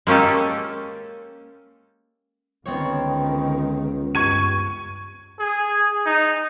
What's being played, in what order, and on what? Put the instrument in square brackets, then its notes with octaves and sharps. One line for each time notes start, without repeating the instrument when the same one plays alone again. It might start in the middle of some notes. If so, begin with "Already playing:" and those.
[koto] G#3 A#3 C#4 G4 A4
[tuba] C#2 [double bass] D3 D#3 [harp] B3 C4 C#5
[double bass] G2 [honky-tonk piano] C#6 G#6 D#7
[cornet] G#4
D#4